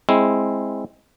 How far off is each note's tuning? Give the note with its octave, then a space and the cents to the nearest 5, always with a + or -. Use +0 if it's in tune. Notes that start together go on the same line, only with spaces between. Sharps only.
G#3 +5 C4 +10 E4 +0